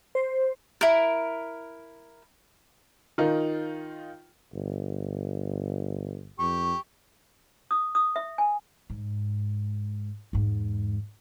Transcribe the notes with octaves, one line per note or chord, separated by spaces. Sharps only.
C5
E4 A#4
D#3 D#4 F4
G1
F2 G4 C#6
D#6
D#6
E5
G#5
G#2
E2 G#2